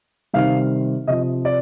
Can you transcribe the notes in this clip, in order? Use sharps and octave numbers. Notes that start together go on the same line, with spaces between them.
C3 D#3 G3 F5
C3 F3 D#5
D5